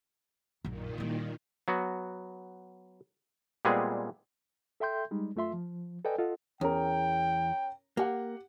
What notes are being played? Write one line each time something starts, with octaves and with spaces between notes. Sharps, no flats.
A#1 F#2 A#2 D#3
G3 E4
F#3 B3 F#4
A#2 G3 G#3 B3 C4 G#4
A4 E5 G5 C6 G6
G3 G#3 D#4
F#2 A3 F4 E5 C6
F3
A4 B4 D5 D#5 G5 G#5
F4 A4 D#5 F#5
E2 C#4 A#4 G5
A#3 G4 F#5